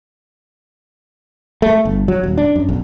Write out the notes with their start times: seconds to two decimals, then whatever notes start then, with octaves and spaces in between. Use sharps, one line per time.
1.62 A3
1.85 G1
2.08 F#3
2.23 D#1
2.38 D4
2.56 F#2
2.69 B1